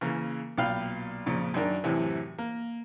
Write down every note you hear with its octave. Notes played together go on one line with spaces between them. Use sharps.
C#3 E3 A#3
B1 A#2 F5 G5 B5 F6
F2 A#2 C#3
F#2 D#3 D4 A#4
F#2 A2 C3 E3
A#3